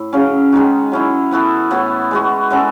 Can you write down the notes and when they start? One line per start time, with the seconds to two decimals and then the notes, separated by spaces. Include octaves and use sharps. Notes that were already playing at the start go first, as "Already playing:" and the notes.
Already playing: A2
0.13 C#3 F#3 C#4
0.52 D#3 G#3 D#4 F#4
0.92 F#3 C#4 E4
1.31 E3 B3 F#4 A4
1.71 A2 E3 B3 F#4
2.11 G#3 B3 F#4
2.50 G#3 C#4 F#4 A4